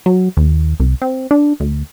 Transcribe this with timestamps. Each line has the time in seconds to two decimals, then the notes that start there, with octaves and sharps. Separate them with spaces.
0.06 F#3
0.37 D#2
0.80 C2
1.02 C4
1.31 D4
1.60 D2